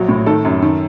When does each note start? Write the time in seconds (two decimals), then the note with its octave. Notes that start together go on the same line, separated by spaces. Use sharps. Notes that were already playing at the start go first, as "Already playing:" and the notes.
Already playing: A#1 F#3
0.09 A2
0.26 D#3 A4
0.45 F#2
0.62 D#3